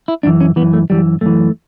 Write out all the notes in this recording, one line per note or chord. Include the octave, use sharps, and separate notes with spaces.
E4
F#2 E3 D4
C#4
F#2 E3 B3
A3
F#2 E3 G3
F#2 E3 A3